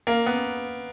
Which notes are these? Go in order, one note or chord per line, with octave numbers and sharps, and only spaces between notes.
A#3
B3